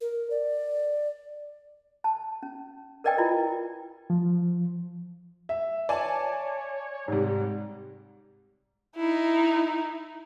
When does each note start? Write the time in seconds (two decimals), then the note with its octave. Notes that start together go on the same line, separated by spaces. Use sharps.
0.01 A#4
0.30 D5
2.04 A5
2.43 C#4
3.04 A#4 B4 D5 D#5 G5 G#5
3.18 E4 F4 D5
4.10 F3
5.49 E5
5.89 C#5 D5 G#5 A5
7.08 G#2 C3 G3
8.96 D#4 E4